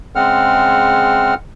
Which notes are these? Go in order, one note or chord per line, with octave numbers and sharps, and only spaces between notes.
C#3 G#3 C4 F#5 F6